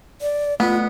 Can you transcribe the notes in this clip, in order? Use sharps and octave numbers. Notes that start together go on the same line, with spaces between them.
D5
A3 B3 F4